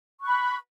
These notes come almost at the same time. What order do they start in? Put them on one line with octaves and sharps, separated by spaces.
C#6 F#6 B5